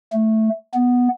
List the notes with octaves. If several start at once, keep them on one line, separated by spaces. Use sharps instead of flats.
A3
B3